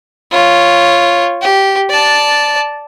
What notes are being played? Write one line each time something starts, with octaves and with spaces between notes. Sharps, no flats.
F4 C#5
G4
D5 A5